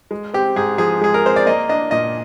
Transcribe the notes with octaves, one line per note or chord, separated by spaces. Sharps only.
G#3
C4 G4
G#2 G#4
F3 G#4
G#3 G#4
A#4
C4 C5
D5
A#3 D#5
D4 D#5
A#2 D#5